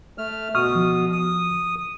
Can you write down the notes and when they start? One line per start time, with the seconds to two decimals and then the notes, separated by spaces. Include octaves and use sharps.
0.18 A3 F6
0.55 B2 C#6 D#6 F6
0.75 F3
1.12 D#6